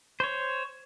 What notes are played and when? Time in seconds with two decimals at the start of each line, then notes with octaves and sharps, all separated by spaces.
0.20 C5 C#5